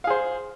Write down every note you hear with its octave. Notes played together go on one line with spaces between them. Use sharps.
G#4 C5 F5